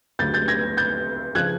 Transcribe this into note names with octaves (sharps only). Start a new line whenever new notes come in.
D2 C#3 F#3 G6 A6
G6 A6
G#6 A#6
G6 A6
C#3 F3 F#6 G#6